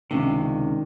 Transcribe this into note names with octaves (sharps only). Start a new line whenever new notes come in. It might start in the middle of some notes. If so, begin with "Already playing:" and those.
C#2 C3 D#3 C#4 D4